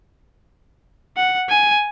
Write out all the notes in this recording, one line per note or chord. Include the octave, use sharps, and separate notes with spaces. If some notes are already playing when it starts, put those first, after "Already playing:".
F#5
G#5